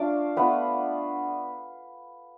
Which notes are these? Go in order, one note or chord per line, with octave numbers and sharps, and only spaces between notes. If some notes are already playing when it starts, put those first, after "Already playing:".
Already playing: A3 D4 F4 D5 F5
A3 B3 D4 F4 B4